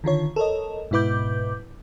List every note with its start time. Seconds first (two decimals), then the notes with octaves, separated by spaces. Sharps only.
0.04 D3 D#3 F4 C#5
0.36 A4 A#4 C#5 D#5
0.91 G#2 B2 E4 B4 D6 G6